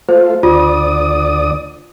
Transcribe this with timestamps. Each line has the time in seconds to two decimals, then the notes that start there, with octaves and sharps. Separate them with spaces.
0.09 A3 F4 C5
0.43 D2 F4 D5 D#6